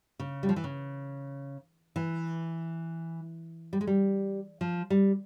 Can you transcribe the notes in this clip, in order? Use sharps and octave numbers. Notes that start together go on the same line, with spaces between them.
C#3
G3
F3
E3
C#3
E3
G3
G#3
G3
F3
G3